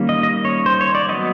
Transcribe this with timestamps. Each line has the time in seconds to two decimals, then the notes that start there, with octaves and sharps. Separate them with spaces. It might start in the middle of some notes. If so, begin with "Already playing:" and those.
Already playing: D#3 G3 A#3 C#4
0.09 D#5
0.23 D#5
0.45 C#5
0.66 C5
0.81 C#5
0.95 D5
1.09 F#3 B3 D#5